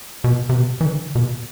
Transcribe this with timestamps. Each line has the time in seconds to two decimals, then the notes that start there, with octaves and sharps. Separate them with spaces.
0.24 B2
0.49 C3
0.55 B2
0.81 E3
0.85 D3
1.15 B2